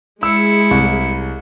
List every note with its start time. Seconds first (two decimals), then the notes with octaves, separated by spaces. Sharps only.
0.23 G#3 E4 G#4 E6 C#7
0.71 C2